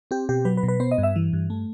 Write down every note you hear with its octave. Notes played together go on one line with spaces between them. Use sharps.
C4 G4
B2 G4
F#3 B4
B4
B2
B4
B3 C5
D#5
G2
E5
E3
G2
A3